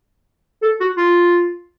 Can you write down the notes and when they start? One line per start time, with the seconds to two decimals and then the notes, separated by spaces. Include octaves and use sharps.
0.62 A4
0.80 F#4
0.97 F4